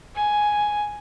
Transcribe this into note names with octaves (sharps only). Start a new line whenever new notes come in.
G#5